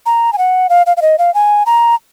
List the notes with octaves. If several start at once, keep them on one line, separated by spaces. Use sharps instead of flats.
A#5
G#5
F#5
F5
F5
F5
D#5
F5
G#5
A#5